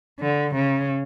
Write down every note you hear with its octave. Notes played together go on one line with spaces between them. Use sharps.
D3
C#3